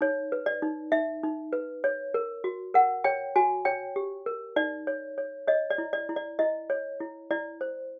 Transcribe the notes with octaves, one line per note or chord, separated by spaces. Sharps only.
D#4 C#5
B4
D5
D#4
D#4 E5
D#4
B4
C#5
A#4
F#4
A#4 F#5
C#5 G5
F#4 G#5
C#5 G5
G4
A#4
D#4 D5
C#5
C#5
C#5 D#5
D5
E4
D5
E4
D5
E4 D#5
C#5
E4
E4 D5
C5